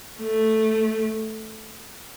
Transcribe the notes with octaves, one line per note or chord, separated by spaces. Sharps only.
A3